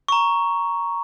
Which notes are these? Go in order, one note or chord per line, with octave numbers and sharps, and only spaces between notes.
A#5 C#6